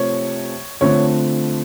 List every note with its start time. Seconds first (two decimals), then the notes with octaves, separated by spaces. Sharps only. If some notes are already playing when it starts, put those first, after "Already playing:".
Already playing: C3 F3 A3 C4 C#5
0.81 D3 F3 A3 C4 C#5